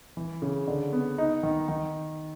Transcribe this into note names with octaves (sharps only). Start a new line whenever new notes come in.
E3
C#3
D3
B3
D#4
D#3
D#3